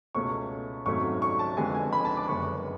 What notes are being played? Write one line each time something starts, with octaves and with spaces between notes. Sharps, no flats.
C#2 B2 A3 C#4 C#6
G#1 G#2 F#3 A3 C#4 C#6
C#6
A5
F2 D3 G#3 B3 G#5
G#5
B5
A5
D6
F#1 F#2 D3 G#3 B3 C#6